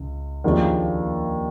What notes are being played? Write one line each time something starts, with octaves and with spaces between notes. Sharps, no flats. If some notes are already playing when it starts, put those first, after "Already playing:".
Already playing: C#2
D#2 C#3 F3 A#3 D4